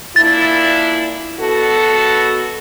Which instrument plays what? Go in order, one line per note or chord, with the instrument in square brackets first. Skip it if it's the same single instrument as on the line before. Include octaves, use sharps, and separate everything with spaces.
[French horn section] A#2 D4 E4 [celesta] A6
[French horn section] B2 F#4 A4